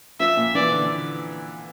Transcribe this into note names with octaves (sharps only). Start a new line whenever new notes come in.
F3 E5
A#2
E3 D5
D3